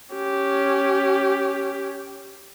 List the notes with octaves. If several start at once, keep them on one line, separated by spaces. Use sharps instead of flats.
C#4 G4